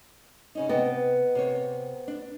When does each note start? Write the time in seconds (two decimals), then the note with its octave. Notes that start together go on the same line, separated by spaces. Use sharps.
0.55 C#3 C#4 D#4
0.69 C3 B3 D#5 G5
1.35 C3 C5 C#5
2.08 D4